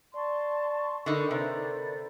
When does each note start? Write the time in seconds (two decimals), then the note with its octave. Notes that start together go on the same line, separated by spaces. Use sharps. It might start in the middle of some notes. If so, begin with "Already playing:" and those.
0.14 D5 A5 C6 C#6
1.06 D3 D#4 A4 A#4 D#5 B5 C#6
1.31 C3 B4 C5 D5